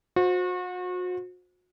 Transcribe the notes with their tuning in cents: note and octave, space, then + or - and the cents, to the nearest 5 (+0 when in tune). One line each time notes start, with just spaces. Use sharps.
F#4 -35 C5 +0